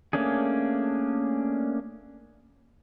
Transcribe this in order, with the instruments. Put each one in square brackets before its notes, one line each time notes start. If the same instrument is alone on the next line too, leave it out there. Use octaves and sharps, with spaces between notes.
[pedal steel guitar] A3 A#3 C#4 D4 G#4